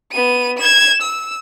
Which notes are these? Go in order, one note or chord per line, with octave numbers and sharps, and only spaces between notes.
B3 D#7
G#6 E7
E6